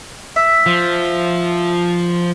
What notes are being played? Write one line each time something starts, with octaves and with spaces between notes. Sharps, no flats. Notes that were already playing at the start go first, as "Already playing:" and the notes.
E5
F3